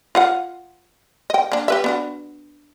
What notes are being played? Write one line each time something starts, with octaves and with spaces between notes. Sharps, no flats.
F4 F5 F#5
D#5 G5
A#3 D4
G4 B4 E5
B3 D4 F#4